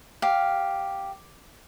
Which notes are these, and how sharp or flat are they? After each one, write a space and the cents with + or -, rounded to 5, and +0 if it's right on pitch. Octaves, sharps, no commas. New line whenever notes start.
G4 +0 F5 +0